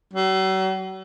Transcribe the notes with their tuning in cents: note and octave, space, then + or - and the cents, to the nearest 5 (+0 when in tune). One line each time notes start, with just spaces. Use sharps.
F#3 +45